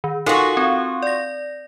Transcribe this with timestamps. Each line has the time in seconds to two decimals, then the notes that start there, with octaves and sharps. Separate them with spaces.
0.04 D#3
0.26 D#4 F4 F#4 A4 A#4
0.57 C4
1.02 D5 A#6